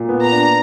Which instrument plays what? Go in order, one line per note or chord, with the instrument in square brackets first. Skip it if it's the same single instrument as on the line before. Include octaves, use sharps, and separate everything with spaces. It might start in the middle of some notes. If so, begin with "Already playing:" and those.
Already playing: [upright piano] A#2
B3
[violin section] A#5
[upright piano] D4